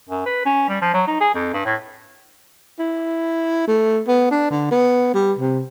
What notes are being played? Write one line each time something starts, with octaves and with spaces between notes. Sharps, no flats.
F#2
B4
C#4
G3
F3
F#3
D#4
G#4
F2
G2
A2
E4
A3
B3
D4
D3
B3
G3
C3